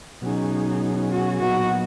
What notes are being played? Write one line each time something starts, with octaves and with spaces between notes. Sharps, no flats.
B2 F#3 C#4 D#4 G#4
F#4
A#2 F#3 B3 D#4 F#4